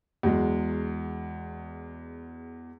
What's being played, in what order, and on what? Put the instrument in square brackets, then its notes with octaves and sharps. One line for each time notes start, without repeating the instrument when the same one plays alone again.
[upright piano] E2 F#3 G#3